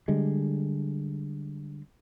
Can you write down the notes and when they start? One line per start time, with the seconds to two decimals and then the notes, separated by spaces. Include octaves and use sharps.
0.08 D3 G3 G#3